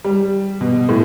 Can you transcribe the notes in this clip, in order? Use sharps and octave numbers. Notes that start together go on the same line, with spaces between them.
G3
B2
A2